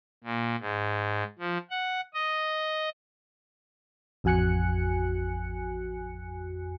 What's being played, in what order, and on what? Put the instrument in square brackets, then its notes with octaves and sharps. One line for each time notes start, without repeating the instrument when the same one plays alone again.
[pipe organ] A#2
G#2
F3
F#5
D#5
[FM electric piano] A1 F2 F#4 G#5 F#6 C#7